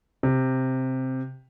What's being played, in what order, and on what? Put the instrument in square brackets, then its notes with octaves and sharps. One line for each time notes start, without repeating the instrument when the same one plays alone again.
[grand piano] C3